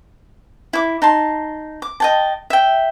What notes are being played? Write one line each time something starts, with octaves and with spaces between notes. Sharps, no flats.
E4 D6
D#4 A5 C6
D6
D#5 G5 A5
E5 G5